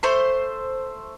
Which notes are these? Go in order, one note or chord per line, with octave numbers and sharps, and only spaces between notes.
A3 C5 C6